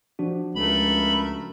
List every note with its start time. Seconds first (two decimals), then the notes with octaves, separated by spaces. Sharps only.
0.19 F3 D4 F#4
0.55 C#2 A3 A#4 B5